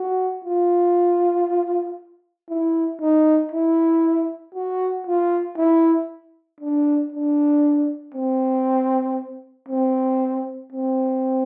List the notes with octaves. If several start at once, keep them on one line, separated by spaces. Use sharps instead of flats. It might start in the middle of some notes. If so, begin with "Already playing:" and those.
Already playing: F#4
F4
E4
D#4
E4
F#4
F4
E4
D4
D4
C4
C4
C4